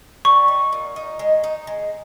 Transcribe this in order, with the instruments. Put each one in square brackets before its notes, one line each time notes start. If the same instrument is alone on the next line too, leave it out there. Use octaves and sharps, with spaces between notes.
[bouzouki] G3 [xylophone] C#6
[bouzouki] D#4
A#2
D#4
G#3
D#4
G#3